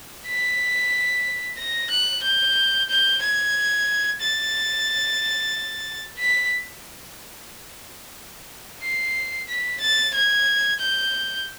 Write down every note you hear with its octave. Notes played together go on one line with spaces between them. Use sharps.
B6
A#6
F#6
G6
G6
G#6
A6
B6
C7
B6
A6
G#6
G6